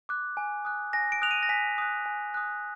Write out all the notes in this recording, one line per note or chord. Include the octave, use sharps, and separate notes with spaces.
D6 F#6
G#5
D#6 F#6
G#5 A#6
D7
D#6 F#6 F7
D#7
A#6
G#5 B6
D#6 F#6
G#5
D#6 F#6